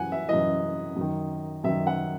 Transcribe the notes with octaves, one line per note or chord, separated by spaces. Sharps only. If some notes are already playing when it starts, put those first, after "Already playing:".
Already playing: F#2 E3 F#5 G#5
E5
F#2 E3 D#5
F#2 D#3
F#2 D#3 E5
F#5